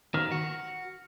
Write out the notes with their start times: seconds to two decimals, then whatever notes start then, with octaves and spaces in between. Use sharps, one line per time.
0.14 D#3 F6
0.32 F#4